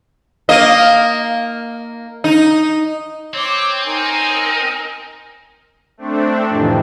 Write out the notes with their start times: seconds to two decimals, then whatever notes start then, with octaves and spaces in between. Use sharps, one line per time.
0.49 A#3 D#5
2.24 D#4
3.34 C4 C#5 D6 E6
3.84 D#4 A#4 G#5
5.97 A3 C4 D4
6.47 F2 A2 C3 D#3 E3